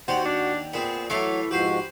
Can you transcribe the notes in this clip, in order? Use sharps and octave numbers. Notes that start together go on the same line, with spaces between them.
D#2 F#4 G4 C5 D5
D4
A#2 B3 C4 D4 G#4
E3 F#3 A3 E4 C#5 F5 A5
G#2 F3 F#4 G4 B4 C5 C6